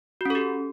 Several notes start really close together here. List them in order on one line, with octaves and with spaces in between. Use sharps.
F#4 C#4 A4 G4